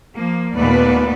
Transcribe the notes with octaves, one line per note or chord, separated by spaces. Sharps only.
F3 A#3
D#2 A#2 A3 B3 B4 D5